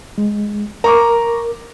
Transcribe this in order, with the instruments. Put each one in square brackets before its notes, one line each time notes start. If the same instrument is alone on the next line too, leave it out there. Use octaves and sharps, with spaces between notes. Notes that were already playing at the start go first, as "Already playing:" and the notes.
[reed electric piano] G#3
[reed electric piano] A#4 [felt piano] A#5 C#6 D6